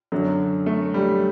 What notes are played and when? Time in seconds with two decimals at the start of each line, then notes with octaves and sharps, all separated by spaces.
0.12 F#2 D3 F#3
0.66 A3
0.94 G3